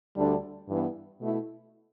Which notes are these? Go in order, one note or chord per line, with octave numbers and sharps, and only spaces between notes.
D2 D3 G3 D4
G2 E3 B3
B2 A3 E4